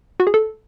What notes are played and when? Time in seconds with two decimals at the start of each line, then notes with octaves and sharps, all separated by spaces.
0.20 F#4
0.27 G#4
0.34 A4